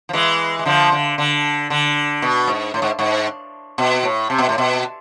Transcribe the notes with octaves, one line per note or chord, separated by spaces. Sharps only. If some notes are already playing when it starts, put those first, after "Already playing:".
F3
E3 G#3
G#3
D3 F3
D3
D3
D3
B2
G#2
A2
G#2
G#2
B2
A2
C3
B2
A2
B2